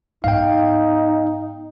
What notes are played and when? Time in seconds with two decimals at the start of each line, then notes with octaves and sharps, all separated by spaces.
0.24 G#2 B3 D#4 F5 G5